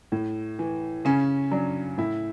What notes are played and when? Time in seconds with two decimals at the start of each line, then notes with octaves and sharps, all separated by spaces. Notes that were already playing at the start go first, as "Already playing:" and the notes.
0.12 A2
0.59 E3
1.05 C#3 C#4
1.51 F#3 D4
1.98 A2 E4